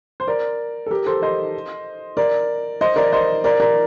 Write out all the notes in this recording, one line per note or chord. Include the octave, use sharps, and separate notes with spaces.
C5
A#4 D5
A4
G4 A#4
A4 C5
C5 D#5
A#4 D5
C5 D#5
A#4 D5
C5 D#5
A#4 D5
A#4 D5